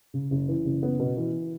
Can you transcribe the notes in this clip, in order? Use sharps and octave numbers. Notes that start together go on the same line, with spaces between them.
C#3
F#1
E3
F#1
B3
B2
E3